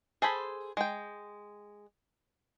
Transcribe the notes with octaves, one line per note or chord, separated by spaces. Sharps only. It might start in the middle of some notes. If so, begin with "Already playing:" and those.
G#4 A4 C5 B5
G#3 G5